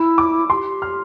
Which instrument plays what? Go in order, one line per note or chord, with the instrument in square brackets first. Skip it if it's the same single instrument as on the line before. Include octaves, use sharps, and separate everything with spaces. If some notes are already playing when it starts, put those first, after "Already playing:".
Already playing: [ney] E4 [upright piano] E6
[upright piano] D6
[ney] G4 [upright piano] C6
[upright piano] F6